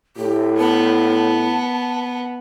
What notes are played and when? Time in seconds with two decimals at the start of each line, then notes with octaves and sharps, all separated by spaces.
0.17 A2 G4
0.58 B3 A5